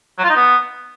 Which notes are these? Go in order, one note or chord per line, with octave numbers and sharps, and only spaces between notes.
F#3
F4
D#4
B3